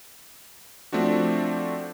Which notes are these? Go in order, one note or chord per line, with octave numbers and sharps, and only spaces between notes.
F3 A3 C4 D4 F#4